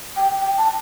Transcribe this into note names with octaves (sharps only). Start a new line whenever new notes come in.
G5
G5
A5